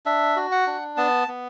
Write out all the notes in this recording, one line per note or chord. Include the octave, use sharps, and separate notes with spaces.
D4 E5
F#4
F#5
D4
B3 A5
B3